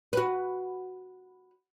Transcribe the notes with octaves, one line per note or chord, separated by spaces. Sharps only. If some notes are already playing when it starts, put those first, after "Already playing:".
F#4 B4